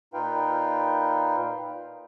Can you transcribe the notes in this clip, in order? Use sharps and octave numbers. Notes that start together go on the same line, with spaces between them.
A#2 D#4 F4 B4 F5 G5